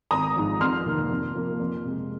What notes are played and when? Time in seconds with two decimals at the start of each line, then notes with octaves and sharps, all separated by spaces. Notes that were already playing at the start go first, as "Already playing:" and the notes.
0.11 G#1 A#5 D#6
0.36 G#2 F3
0.60 F2 C6 F6
0.86 C3 D#3 A#3
1.10 F2
1.35 F3 A#3
1.60 F2
1.84 C3 G#3